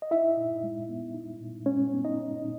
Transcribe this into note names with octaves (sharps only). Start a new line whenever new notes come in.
D#5
D#4 E4 E5
A#2
G#3
B3
D#4
A#2
G#3 C#4 C#5
B3
D#4 D#5
D#4
A#2